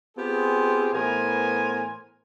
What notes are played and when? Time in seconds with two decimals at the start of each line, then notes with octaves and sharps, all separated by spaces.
0.17 B3 C4 F4 G4 G#4
0.94 A2 E3 B3 A#4 C5 G#5